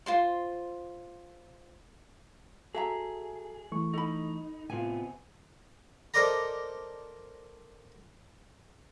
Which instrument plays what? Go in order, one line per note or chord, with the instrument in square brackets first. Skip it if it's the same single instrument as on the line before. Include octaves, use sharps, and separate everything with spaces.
[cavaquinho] F4 C5 C6
[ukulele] F#4 E5 A#5 [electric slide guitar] G#4 [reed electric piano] A4
[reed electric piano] E3 A3 C#6
[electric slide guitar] D#4 [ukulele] A4 B5
[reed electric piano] A2 F4 [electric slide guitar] C3 B3 C4 [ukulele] G#5
[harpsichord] A4 A#4 C5 D5 D#5 A#5